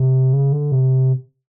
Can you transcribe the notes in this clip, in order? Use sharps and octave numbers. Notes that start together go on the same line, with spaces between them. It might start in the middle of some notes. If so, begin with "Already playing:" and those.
Already playing: C3
C#3
D3
C3